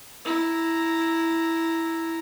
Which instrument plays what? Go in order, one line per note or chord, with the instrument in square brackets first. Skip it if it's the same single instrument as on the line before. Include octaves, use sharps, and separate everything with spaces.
[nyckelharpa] E4 A#5